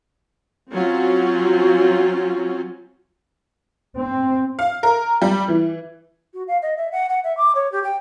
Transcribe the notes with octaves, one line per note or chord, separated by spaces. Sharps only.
F#3 C4 C#4 F4
C4
F5
A#4
G3
E3
F#4
F5
D#5
E5
F#5
F#5
E5
D6
C#5
G4
G5